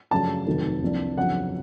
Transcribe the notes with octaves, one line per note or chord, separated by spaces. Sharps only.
F#2 C#3 F3 A3 D4 A5
F1 D#2 D#3 F#3 A3
C2 C3 F3 A#3 D4
G1 F2 C#3 F#3 F#5